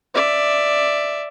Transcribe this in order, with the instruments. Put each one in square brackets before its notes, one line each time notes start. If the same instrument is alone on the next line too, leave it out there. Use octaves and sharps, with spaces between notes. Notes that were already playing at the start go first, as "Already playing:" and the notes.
[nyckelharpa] D5 E5